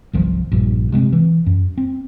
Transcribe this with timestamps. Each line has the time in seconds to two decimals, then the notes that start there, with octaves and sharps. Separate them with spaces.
0.13 G1 C2 D#3 F3
0.52 A#1 G2
0.92 C3 G#3 B3 C4
1.13 E3
1.46 F#2
1.78 C4